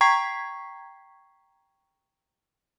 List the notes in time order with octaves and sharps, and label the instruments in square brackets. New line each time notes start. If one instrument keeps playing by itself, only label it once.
[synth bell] G5 A#5 C#6 G#6 B6 C7